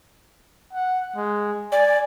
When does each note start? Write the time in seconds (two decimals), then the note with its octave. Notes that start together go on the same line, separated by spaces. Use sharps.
0.73 F#5
1.16 G#3
1.72 D5 G#5